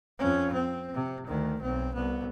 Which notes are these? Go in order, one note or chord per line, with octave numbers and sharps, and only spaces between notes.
F2 C#4
C4
C3
D2 D#3
B1 C4
C2 B3